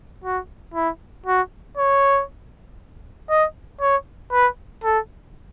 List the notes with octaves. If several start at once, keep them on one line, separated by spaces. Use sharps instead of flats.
F#4
E4
F#4
C#5
D#5
C#5
B4
A4